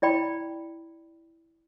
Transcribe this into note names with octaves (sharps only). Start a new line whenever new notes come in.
E4 D5 G5 B5